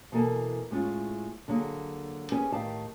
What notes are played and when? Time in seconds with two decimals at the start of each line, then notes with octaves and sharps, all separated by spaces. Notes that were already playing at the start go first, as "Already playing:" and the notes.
0.12 B2 E3 A#3 A4 G#5
0.70 A2 G#3 C#4 F4
1.48 D3 F#3 A#3 G#4
2.32 C#4 G4 G#4 B4 C#5 G#5
2.52 A2 D#3 G4 F5 A5